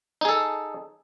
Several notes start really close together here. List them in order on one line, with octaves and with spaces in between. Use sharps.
D#4 G#4 A4